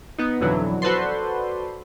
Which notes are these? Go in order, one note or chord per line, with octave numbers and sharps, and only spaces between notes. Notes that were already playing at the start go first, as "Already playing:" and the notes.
B3 D#4
F2 B2 D3 E3 F#3
F#4 A4 B4 C5 D5 C6